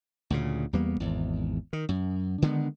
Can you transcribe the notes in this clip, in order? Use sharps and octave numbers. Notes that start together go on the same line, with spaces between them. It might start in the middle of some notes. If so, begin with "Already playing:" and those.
D2 A#2 C#3
E2 G3 A#3 B3
G#1 E2
D#3
F#2
D3 D#3 G#3 B3